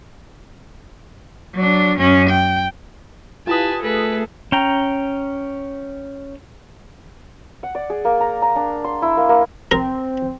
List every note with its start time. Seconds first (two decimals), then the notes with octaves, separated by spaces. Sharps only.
1.54 F#3 D4
1.98 F#2 C#4
2.30 G5
3.47 E4 F4 G4 B4 G#5 A5 D#6
3.83 A3 G#4 A4 B4
4.52 C#4 G5 A#5
7.63 F#5
7.75 D5
7.90 G#4
8.05 A#3
8.20 A#5
8.42 A#5
8.56 D4
8.84 C6
9.02 E4
9.17 A#3
9.29 A#3
9.71 C4 A#4